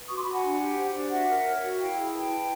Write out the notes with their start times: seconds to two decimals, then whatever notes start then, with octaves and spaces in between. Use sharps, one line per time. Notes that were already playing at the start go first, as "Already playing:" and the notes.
Already playing: B4
0.08 F#4 C#6 D#6
0.16 C6 D6
0.24 F#4 B5 C#6
0.33 F#5 G#5
0.42 D4
0.60 G4
0.76 C5
0.93 D4
1.10 F#4 E5 F#5
1.28 A#4
1.44 C#5
1.62 F#4
1.79 E4 F5 G5
1.96 G#4
2.12 B4 G5 A5
2.29 E4